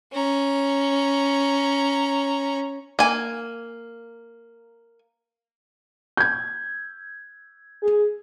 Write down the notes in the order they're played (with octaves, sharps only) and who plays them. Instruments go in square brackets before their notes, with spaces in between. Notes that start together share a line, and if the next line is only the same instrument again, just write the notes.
[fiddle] C#4 A#5
[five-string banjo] A#3 G#5
[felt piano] G6 G#6
[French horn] G#4